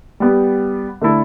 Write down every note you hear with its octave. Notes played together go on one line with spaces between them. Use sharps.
G3 B3 G4
D3 A3 E4 A4